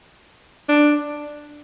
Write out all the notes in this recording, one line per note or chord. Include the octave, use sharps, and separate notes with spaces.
D4